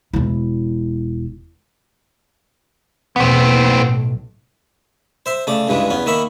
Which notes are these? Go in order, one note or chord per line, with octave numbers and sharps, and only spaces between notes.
E1 E4
B1 E2 B3 C4
B1 A2
C5 E5 C6
C#3 A3 D5 D6
C#2 G2 C#3 E3 G#3
E2 B3 C#4
D#3 A#3 E5 B5 C#6